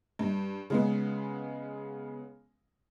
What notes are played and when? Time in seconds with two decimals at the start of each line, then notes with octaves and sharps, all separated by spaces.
0.19 G2
0.70 C#3 G#3 B3